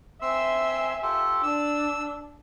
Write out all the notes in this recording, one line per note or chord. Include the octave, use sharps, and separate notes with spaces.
C4 E5 G#5 C6 E6
F4 G4 A4
D4 E6